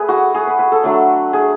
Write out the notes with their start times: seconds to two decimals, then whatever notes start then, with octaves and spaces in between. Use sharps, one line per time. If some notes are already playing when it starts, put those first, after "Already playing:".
Already playing: A3 G#4 B4
0.08 F#4
0.34 G#4
0.47 B4
0.59 B4
0.72 A4
0.84 F#3 A3 D4
1.33 G#4